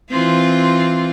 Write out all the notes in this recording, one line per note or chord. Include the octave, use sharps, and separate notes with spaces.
E3 C4 F4